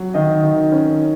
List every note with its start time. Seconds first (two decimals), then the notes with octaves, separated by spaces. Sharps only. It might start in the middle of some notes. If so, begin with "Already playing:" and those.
Already playing: F#3
0.14 D#3 D#5
0.43 D#3
0.72 C#4